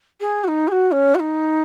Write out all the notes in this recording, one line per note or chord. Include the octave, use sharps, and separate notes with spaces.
G#4
F#4
D#4
G#4
F#4
C#4
F#4
D#4